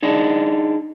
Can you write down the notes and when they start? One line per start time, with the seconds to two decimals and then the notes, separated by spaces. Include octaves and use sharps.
0.03 D4 D#4 G#4